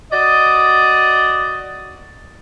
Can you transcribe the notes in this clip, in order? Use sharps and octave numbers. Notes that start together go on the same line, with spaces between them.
F#4 D5 D#5